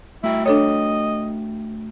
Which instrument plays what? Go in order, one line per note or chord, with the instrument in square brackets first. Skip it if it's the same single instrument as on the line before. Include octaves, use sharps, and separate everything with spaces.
[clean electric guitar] A3 F#4 G5 [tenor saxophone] E4
[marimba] D4 A4 C#5 [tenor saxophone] D#5